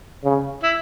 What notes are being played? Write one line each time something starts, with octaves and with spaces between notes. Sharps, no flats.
C#3
E4